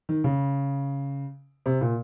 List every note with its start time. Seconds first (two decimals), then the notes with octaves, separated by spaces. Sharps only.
0.09 D#3
0.24 C#3
1.66 C3
1.81 A#2